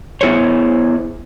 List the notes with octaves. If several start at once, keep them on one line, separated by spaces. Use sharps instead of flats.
B3 E4 G#4 C5 C#5